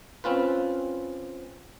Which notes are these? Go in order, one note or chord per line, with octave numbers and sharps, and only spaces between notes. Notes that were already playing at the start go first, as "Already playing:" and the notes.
C4 C#4 F4 B4